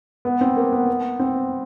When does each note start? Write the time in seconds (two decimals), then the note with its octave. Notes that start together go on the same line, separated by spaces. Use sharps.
0.25 B3
0.41 C4
0.57 A#3
0.72 B3
1.19 C4